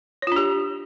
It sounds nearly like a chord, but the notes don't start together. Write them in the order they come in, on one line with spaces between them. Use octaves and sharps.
C#5 F4 D4 G4